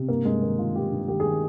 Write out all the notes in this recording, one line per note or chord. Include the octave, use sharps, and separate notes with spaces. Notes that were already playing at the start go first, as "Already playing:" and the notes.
Already playing: C3
G2 A#3
G2 G#3
D#3 A#3
D#3 F4
G2 G4
G2
D#3 G4
G#4
D#3